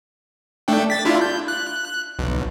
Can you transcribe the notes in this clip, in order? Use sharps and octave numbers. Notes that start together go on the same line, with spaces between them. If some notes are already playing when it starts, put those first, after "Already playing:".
A3 D4 G5
A6 B6
D4 E4 F4
G6
F#6
B1